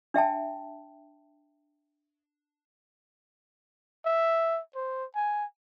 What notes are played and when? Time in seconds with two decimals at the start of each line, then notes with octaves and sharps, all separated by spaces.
0.14 D4 E5 G5 A5
4.05 E5
4.75 C5
5.15 G#5